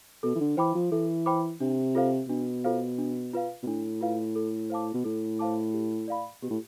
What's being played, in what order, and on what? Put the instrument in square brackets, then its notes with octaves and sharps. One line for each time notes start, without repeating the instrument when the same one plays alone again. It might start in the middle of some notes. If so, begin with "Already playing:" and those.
[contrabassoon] B2 [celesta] A4
[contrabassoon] E3
D3
[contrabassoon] E3 [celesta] C5 G5 B5 D6
[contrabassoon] F3
[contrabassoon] E3 [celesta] A4
[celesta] C5 G5 B5 D6
[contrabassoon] C3 [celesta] D4
[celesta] F4 A4 C5 F5
[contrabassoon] B2 [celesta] D4
[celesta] F4 A4 C5 F5
D4
F4 B4 F5
[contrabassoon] B2
[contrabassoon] A2 [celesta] D4
[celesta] F4 B4 F5
A4
C5 F5 A5 D6
[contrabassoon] B2
[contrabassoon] A2 [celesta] A4
[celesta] C5 F5 A5 D6
G4
D5 F5 B5
[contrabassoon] B2 [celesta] G4
[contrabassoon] A2